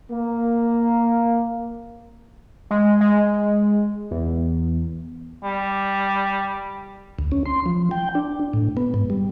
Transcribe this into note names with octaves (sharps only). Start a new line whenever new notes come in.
A#3
G#3
G#3
E2
G3
D2
C#4
C6
F3
G5
D4
A2
B3
G#2
G3